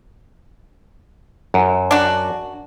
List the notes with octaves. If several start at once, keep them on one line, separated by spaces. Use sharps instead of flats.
F#2
D4 F#4